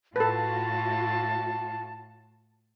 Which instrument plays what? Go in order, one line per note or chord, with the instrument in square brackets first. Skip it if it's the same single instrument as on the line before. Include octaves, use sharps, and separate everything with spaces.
[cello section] A2 F4 F#4 [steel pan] A4 B4 [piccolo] A5